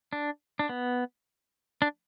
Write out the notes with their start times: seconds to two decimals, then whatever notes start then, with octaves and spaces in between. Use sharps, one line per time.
0.13 D4
0.59 D4
0.69 B3
1.82 D4